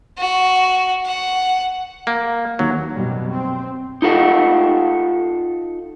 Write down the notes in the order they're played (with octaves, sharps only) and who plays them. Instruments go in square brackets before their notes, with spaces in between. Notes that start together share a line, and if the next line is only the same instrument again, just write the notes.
[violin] F#4
F#5
[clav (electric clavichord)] A#3
[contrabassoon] D#2 [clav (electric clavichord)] F#3
[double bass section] F#2 B2 G3
C4
[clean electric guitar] D#4 F4 A4 F#5